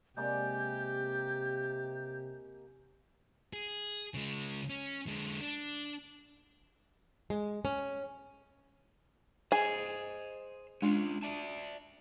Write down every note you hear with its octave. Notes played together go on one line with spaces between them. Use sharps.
C3 G#3 A#3 G4 D5 G6
G#4
C#3 G#3
C#4
D3 G#3
D4
G#3
C#4
G#4 C5 D#5
G#3 C#4 D4 F4
D5 E5 A5